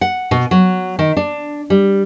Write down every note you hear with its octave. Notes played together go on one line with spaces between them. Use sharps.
F#5
B2
F#3
D#3
D4
G3